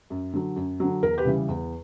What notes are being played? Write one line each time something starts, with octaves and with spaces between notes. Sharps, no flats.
F#2
D3 F#3
F#2
D3 F#3
E2 A#4
G4 B4
C#3 E3 G3
E2